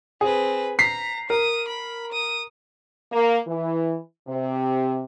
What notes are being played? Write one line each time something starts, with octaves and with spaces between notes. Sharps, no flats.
C4 G#4 B4
A#5 B6 C7
A#4 D#6
B5
D#6
A#3
E3
C3